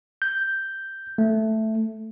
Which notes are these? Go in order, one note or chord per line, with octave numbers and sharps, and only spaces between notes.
G6
A3